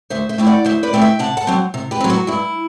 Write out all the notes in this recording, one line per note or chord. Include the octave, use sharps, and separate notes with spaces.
D2 C5 E5
C5 E5
D3 A3 C4 E4
D5 F#5
D2 C5 E5
B4 D5
D3 A3 C4 E4
E5 G5
C3 F#5 A5
F#5 A5
F#3 C4
C3
G4 B4
F#3 C4
F#4
G2 E4